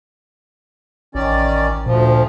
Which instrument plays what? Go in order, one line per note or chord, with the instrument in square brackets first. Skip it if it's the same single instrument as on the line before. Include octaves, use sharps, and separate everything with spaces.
[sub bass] A1 [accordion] D#3 C#4 D5
[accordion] D2 F3 [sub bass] A#2